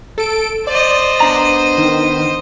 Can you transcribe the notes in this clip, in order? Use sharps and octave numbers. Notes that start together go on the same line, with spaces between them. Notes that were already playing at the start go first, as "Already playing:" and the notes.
A4 D7
C5 D5 D#5
B3 D4 A#5
D#3